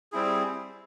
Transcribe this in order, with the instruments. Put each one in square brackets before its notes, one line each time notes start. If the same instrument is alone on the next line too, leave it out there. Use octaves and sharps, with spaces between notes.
[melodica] G3 C4 E4 G#4